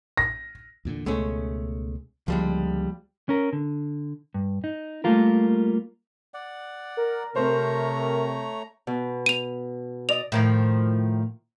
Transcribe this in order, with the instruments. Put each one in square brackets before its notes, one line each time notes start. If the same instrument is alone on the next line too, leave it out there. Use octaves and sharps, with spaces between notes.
[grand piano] A#6
[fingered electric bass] E2 A#2 D3
[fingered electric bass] C#2 B2 [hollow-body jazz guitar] G#3 A3 C#4
[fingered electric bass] C#2 D3 A#3 [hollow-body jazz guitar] F3 G3 G#3
[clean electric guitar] C#4 A#4
D3
G2
D#4
G3 A3 A#3 F4 A#4
[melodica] D5 F#5
[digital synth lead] A#4
[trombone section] C3 [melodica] A3 C#5 A#5 [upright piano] C4 C5
[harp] B2
[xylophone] D#7 F7
[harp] D5 D#5 D#6 [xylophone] F7
[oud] A2 D#3 F3